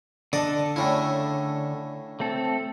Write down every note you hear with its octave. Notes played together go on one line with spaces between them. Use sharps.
D3 D4 A4 D5 D#5 A5
A2 C#3 E4
A3 C4 A4